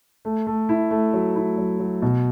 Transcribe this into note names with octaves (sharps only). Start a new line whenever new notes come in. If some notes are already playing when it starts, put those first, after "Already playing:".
A3
A3
E4
A3
F#3
E4
F#3
F#3
B2